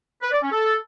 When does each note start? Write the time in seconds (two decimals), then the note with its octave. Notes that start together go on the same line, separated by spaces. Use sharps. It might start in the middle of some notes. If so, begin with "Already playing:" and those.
0.22 B4
0.32 D5
0.42 C#4
0.51 A4